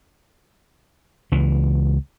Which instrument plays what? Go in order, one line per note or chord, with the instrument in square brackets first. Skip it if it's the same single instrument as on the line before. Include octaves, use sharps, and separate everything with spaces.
[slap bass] C#2 E3